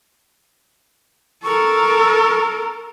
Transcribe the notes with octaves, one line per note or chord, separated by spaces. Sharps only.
A4 A#4 C#6